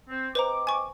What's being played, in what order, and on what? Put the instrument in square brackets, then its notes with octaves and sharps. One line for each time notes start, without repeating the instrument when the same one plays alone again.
[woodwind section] C4
[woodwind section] C4 D#5 D6 [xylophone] B4 C5 A#5
[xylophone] G#5 C#6